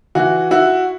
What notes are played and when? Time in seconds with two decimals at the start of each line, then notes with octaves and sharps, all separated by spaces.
0.15 E3 F#4
0.51 E4 F#4